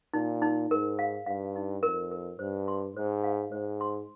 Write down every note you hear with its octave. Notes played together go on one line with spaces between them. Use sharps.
A#2 D#4
D#4
G#2 A#4
F5
G2 F5
D#4
F2 A#4
A#4
G2 C5
C6
G#2 C5
F5
G#2 C5
C6